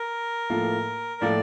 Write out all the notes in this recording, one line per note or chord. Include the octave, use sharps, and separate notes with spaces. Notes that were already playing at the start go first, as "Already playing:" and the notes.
Already playing: A#4
A2 F3 A#3 F4 A4
A2 F3 A#3 F4 A4 D5